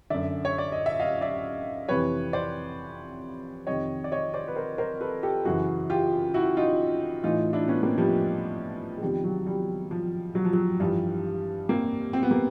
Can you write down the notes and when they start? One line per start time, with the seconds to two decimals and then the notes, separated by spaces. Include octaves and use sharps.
0.10 F#2 D3 D5 E5
0.45 C#5
0.58 D5
0.72 D#5
0.86 E5
0.99 D#5 F5
1.21 D5 E5
1.88 F2 C3 E3 B4 C#5
2.33 C5 D5
3.67 F2 C3 D#3 C#5 D#5
4.04 D5
4.12 C#5 D#5
4.34 C5 D5
4.48 B4
4.56 A#4 C5
4.78 A#4 C5
5.01 A4 B4
5.23 G4 A4
5.45 F#2 C#3 E3 F#4 G#4
5.90 F4 G4
6.34 E4 F#4
6.57 D#4 F4
7.23 A2 E3 D#4 F4
7.53 D4 E4
7.68 B3 C#4
7.83 A#3 C4
7.97 F3 G3
8.97 G#3
9.02 E2 C3 D#3 F3 G3
9.24 F#3
9.46 F3 G3
9.91 F3
10.35 F#3
10.45 F3
10.53 F#3
10.80 G2 E3 F3 G3
11.69 A#3 C4
12.13 C4
12.23 B3
12.31 A#3 C4